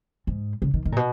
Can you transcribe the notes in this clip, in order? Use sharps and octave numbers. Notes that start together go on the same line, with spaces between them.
G#2
C#3
D#3
D#3
A#2
B2